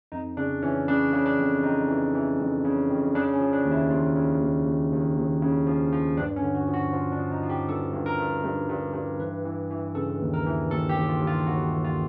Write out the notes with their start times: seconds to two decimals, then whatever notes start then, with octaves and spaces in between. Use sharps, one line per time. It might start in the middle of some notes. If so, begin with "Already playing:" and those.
0.12 F2 D#4
0.37 C#3 D4
0.62 E3 C#4
0.88 C#3 D4
1.13 C#3
1.26 D4
1.39 F2
1.63 F2 D#4
1.88 E3
2.15 E3
2.39 F2
2.65 C#3
2.90 F2
3.15 C#3 D4
3.33 C#4
3.40 F3
3.53 D4
3.65 D#2
3.72 E4
3.90 D#2 F4
4.16 C#3
4.41 D#2
4.66 D#2
4.92 D#2
5.17 D#2
5.42 C#3
5.67 F3
5.93 F3
6.17 G2 D4
6.36 C#4
6.42 D3
6.55 F#4
6.67 F3
6.74 F#4
6.93 F3 F4
7.12 D4
7.18 F3
7.31 D#4
7.43 F3
7.49 G4
7.68 G2 A4
7.93 G2
8.06 A#4
8.19 G2
8.44 G2
8.70 G2
8.94 G2
9.20 E3 B4
9.45 E3
9.70 E3
9.95 C#3 A4
10.20 D#2
10.34 A#4
10.46 E3
10.71 D#2 A4
10.89 G4
10.96 D#2
11.09 F4
11.21 D#2
11.27 F4
11.46 D#2 F#4
11.71 D#2
11.84 F4